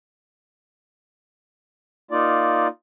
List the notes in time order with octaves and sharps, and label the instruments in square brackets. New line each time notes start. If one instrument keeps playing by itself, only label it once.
[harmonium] A#3 D#4 F4 D5